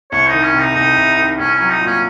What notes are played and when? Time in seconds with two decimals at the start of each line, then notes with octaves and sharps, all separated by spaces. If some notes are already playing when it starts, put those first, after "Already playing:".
0.12 C2 C#5
0.28 D#4
0.34 D#3
0.43 C#4
0.54 C3
0.60 D#4
0.75 C2 D#4
0.97 C2
1.18 D#3
1.39 C2 C#4
1.55 C#4
1.60 F#3
1.70 D#4
1.81 A#2 C#4